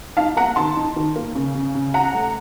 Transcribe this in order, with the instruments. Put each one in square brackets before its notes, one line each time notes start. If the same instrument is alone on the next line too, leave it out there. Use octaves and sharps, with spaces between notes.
[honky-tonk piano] D#4 F5 A5
A#3 F#5 A#5
D#3 A5 C6
D#4
D#3
A#3
C#3
C#3
C#3
C#4 F#5 A#5
A3